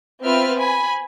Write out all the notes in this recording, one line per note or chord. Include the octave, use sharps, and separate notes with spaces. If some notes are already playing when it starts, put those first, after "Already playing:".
B3 C4 F4 B4 E5 F6
G#5 B5